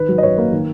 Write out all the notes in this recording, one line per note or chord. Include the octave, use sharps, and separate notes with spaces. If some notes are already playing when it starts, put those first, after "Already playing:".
Already playing: D#3 B4
F#3
D#5
F#2 C#5
A#3
D#3